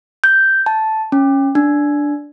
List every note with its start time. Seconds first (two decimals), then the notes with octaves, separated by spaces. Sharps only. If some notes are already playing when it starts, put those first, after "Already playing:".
0.24 G6
0.66 A5
1.12 C#4
1.55 D4